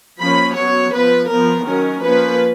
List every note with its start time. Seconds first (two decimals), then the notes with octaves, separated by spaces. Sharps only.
0.20 F3 A#3 C#4 B5
0.56 F#3 B3 C#5
0.93 F3 B3 B4
1.30 F3 B3 A#4
1.67 D#3 F#3 C#4 A#4
2.03 F3 A#3 C#4 B4